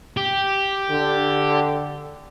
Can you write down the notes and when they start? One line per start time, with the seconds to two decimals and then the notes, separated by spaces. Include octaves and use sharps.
0.17 G4
0.90 D3